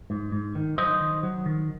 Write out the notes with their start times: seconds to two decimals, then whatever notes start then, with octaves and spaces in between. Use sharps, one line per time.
0.10 G#2
0.32 G#2
0.55 D#3
0.78 F#3 C5 D#5
1.00 D#3
1.23 F#3
1.46 D#3